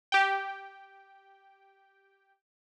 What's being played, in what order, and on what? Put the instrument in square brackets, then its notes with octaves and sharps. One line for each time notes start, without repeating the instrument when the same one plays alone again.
[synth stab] G4 G5